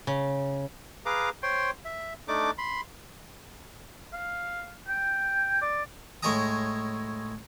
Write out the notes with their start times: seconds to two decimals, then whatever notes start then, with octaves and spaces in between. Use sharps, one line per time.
0.07 C#3
1.06 G#4 B4 F5 A#5 D6
1.43 C5 C#5 G5 C6
1.85 E5
2.28 A3 D4 D#4 D5 D6
2.58 B5 C6
4.13 F5
4.88 G5
5.61 D5
6.23 A2 G#3 C#5 G#5 A#5 D#6